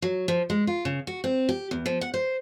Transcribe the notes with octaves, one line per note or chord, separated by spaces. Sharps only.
F#3
F3
G#3
F4
C#3
F#4
C4
G4
E2
F3
F#5
C5